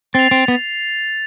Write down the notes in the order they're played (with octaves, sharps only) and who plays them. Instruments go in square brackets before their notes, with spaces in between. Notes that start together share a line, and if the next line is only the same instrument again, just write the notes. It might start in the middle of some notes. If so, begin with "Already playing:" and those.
[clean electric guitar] C4 [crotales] A6 C7 F7
[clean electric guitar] C4
B3